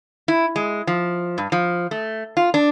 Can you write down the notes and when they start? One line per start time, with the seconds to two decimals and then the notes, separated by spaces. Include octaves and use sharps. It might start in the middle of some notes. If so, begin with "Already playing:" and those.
0.28 E4
0.56 G#3
0.87 F3
1.38 G2
1.52 F3
1.91 A3
2.37 F4
2.54 D4